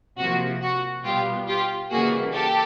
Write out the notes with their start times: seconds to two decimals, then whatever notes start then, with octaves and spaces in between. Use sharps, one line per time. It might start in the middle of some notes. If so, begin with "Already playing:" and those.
0.18 C3 F3 A#3 F#4
0.62 F#4
1.04 B2 G3 B3 F4 G4
1.47 F4 G4
1.91 C#3 E3 G3 A#3 F#4 G#4
2.34 G4 A4